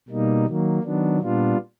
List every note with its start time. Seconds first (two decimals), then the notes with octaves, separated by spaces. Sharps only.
0.08 B2 G3 A#3 D#4
0.46 D#3 F#3 A#3
0.83 D#3 F#3 B3 D4
1.21 A#2 G3 B3 D4 F4